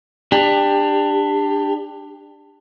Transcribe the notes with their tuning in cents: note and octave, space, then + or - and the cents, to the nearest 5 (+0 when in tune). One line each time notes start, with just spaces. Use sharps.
D4 +15 G4 +25